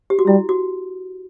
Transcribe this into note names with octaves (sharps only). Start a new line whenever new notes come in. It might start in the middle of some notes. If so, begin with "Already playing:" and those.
G4
F#4
G3 E4
F#4